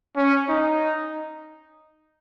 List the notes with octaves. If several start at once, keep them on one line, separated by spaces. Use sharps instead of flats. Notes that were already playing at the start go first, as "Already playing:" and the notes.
C#4
D#4